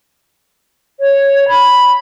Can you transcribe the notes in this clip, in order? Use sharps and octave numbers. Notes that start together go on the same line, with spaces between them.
C#5
B5